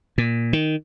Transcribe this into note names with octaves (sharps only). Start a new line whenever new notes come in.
A#2
D#3